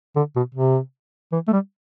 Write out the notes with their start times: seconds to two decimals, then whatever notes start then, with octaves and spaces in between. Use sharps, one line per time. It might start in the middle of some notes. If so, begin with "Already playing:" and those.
0.16 D3
0.36 B2
0.55 C3
1.32 E3
1.48 A3
1.53 G3